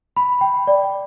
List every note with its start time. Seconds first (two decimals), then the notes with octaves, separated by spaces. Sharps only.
0.16 B5
0.41 G5
0.67 D5